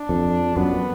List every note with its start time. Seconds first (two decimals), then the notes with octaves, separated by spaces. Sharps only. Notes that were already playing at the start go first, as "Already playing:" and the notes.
Already playing: D4
0.09 F2
0.57 F#2 B3